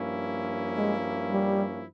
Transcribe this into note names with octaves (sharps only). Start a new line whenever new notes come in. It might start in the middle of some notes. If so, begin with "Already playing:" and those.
Already playing: G2 F3 A#3 C#4 E4
G#3
G3